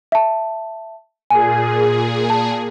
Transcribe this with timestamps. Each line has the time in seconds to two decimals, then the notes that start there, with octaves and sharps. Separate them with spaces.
0.12 E5 A5
1.30 A#2 G#4 G#5
2.30 A5